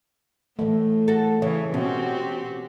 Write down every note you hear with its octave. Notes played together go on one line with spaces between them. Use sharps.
A2 E3 A3
F#4 A4
C#3 E3 C#5
B2 C4 C#4 F#4 G4